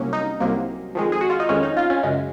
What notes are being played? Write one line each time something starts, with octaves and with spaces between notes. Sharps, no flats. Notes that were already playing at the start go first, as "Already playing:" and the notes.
Already playing: C2 C3 F#3 A#3 C#4
D#4
C2 C3 F#3 A#3
F2 D#3 G#3
G#4
F#4
F4
D#4
F2 D#3 G#3 C#4
D#4
F4
C#4
F#2 C#3 G#3